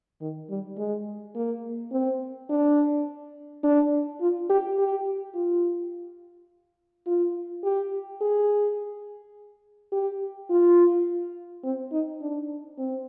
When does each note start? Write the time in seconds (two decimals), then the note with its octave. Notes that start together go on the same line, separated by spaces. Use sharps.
0.21 D#3
0.49 G3
0.78 G#3
1.35 A#3
1.92 C4
2.49 D4
3.64 D4
4.21 F4
4.49 G4
4.79 G4
5.35 F4
7.07 F4
7.64 G4
8.21 G#4
9.92 G4
10.50 F4
11.64 C4
11.92 D#4
12.21 D4
12.78 C4